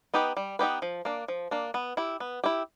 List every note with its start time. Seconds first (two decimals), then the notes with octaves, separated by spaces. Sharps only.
0.14 B3 D#4 G4 B4
0.37 G3
0.59 B3 D#4 G4 B4
0.82 F3
1.05 A#3 D4
1.28 F3
1.51 A#3 D4
1.74 B3
1.97 E4 G4
2.20 B3
2.44 E4 G4